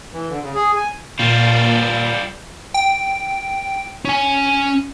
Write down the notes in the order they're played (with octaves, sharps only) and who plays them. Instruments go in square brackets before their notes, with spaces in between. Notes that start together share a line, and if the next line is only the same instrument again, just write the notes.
[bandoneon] E3
D3
C#3
G#4
G#5
[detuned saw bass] A#2 [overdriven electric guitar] G3 F4
[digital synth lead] G5
[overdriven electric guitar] C#4 G#5